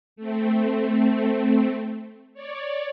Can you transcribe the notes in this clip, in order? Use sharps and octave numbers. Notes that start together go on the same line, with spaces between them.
A3 C4
C#5 D5